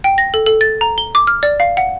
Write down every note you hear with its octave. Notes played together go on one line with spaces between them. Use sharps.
G5
A#6
A4
A4
A6
A#5
G7
D6
F6
D5
F5
F#5